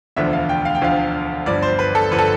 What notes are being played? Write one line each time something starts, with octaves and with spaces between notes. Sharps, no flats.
E1 D2 D3 F3 E5
F5
G5
F5
G5
E1 D2 D3 F3 F5
G1 G2 F3 D5
C5
B4
A4
G1 F3 B4
A4